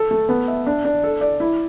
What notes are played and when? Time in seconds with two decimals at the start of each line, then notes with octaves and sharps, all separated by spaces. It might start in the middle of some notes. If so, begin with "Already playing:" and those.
Already playing: A4
0.11 A3
0.29 B3
0.48 E5
0.66 D4
0.85 D4
1.04 A4
1.21 D5
1.40 E4